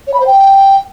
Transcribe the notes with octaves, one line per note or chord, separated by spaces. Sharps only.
C#5
B5
C5
G5